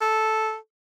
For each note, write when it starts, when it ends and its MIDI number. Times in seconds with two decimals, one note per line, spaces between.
0.01 0.56 69